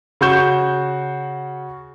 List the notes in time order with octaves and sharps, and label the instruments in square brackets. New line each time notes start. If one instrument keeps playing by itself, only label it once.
[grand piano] C#3 F#4 C#6 G6 E7